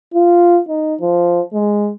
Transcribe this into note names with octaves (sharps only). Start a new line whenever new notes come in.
F4
D#4
F3
G#3